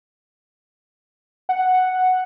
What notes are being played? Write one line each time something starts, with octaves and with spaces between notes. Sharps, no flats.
F#5